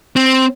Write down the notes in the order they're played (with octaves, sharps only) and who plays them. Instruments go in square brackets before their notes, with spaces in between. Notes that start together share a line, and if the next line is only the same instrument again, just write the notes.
[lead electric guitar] C4